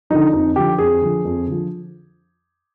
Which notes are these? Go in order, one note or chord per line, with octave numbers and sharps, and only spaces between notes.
D3 F3 D#4
F2 D#4
D3 F3 G4
F2 G#4
D3 F3
F2
D3 F3